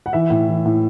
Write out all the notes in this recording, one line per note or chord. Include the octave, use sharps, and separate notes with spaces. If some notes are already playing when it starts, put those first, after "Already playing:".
F#5
E3 E5
A2
E3
A2